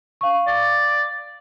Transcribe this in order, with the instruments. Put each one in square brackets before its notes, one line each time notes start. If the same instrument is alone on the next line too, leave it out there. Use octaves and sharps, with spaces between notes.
[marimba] F5 C#6
[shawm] D5